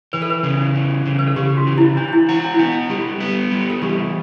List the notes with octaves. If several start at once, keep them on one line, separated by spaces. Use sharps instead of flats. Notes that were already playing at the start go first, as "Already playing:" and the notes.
E3 B4
A4
B4
C#3
E3
C#3
B4
A4
C#3 G4
F#4
E3
E4
E3 D4
D4
E4
E4 F#4
E4
D4
E4
B3 D4
G3 G4
B3
G3
A4
E3 G4